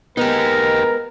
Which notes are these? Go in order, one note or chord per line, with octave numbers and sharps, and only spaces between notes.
G#3 B3 D#4 G4 A#4